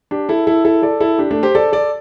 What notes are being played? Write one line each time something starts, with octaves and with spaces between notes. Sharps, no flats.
D4 G4
E4 A4
E4 A4
E4 A4
A4 D5
E4 A4
D4 G4
A3 D4
G4 C5
A4 D5
A4 D5